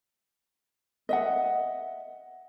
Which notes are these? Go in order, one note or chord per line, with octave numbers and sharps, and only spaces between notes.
D#5 E5 F#5